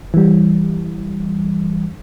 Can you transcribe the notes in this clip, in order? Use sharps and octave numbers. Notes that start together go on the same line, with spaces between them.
E3 G3